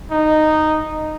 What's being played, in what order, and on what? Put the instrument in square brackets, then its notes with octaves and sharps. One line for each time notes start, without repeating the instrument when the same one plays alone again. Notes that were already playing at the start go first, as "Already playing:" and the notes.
[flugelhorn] D#4